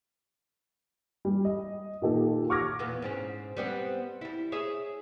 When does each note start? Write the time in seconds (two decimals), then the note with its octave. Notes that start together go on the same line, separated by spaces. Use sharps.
1.25 G3
1.45 D#5
2.02 A#2 D#3 G4 A4
2.50 C#6 D6 F6 G#6 A#6
2.79 E2 A#2 B3
3.02 G#2 C4 C#4
3.57 G3 B3 C4
4.21 G3 E4
4.52 G#4 C#5 E5